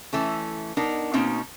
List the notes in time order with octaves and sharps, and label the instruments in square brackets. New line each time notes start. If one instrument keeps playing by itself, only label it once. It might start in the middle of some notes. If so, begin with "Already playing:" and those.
[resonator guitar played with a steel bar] E3 A3 C#4
B3 D4 D#4 A#4
B2 A#3 C4 C#4 D#4